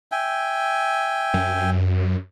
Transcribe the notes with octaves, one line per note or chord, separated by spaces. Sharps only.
E5 G5 G#5
F#2